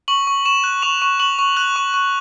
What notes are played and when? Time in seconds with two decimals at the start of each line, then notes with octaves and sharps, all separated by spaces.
0.08 C#6 F#7
0.27 C#6
0.45 C#6 E7
0.64 F#6
0.82 C#6 F7
1.02 C#6
1.20 C#6 F#7
1.39 C#6
1.57 F#6 F#7
1.76 C#6
1.94 C#6